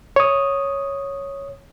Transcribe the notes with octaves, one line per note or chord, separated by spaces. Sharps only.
C#5 D#6